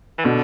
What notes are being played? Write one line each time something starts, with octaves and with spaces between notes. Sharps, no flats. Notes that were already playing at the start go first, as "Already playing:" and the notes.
E3
B2 D3